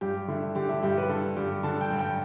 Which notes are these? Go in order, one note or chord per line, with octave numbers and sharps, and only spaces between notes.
G2 G4
D3 E4
D3 G4
E4
G2 G4
B4
D3 A4
G2 G4
D3 A5
G5
G2
G5